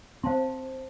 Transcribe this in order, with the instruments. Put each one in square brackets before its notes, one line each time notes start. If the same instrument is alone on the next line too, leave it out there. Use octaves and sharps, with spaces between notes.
[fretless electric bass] C4 [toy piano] C5 F5 A5 C6